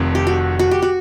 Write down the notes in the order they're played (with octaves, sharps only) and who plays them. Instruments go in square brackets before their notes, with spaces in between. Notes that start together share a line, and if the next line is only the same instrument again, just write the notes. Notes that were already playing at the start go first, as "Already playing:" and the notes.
Already playing: [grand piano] F1 F2 C3 D#3
[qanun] G4
F#4
F#4
G4
F#4